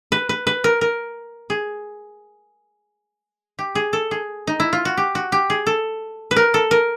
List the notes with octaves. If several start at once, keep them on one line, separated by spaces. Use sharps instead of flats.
B4
B4
B4
A#4
A#4
G#4
G4
G#4
A4
G#4
D#4
E4
F4
F#4
G4
F#4
G4
G#4
A4
B4
A#4
A4
A#4